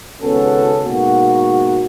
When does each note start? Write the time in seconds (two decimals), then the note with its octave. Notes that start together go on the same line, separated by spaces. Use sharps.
0.20 G#1 C#2 B3 C#4 F#4 A4
0.82 G#2 B2 A#3 F#4